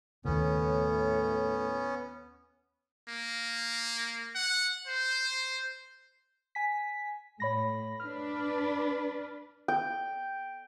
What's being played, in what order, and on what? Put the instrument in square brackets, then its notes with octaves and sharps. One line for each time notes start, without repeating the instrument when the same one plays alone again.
[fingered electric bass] D#2 C#3 [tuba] A2 [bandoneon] B3 C#4
[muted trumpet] A#3
F#5
C5
[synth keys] G#5 B6
[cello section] A2 [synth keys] C#5 B5 A#6
[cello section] D4 B4 [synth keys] F6
[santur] G5